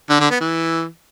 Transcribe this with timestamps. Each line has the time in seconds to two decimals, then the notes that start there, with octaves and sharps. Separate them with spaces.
0.10 D3
0.20 D3
0.30 B3
0.40 E3